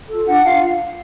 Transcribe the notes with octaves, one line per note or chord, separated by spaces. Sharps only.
F4 A4
D4 F#5
F4 F5